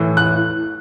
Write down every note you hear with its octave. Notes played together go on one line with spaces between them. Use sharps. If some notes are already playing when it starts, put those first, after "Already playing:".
Already playing: A2 E3
F#6